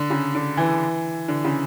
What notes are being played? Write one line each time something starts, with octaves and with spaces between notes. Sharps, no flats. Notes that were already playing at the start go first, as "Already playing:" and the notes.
Already playing: D3
C#3
D3
E3
D3
C#3